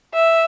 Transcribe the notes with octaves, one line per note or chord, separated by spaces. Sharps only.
E5